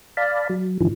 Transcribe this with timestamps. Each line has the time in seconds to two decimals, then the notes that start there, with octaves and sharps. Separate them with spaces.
0.17 D5 F5 A5 B5
0.50 F#3
0.81 G#2 D3 E3 F3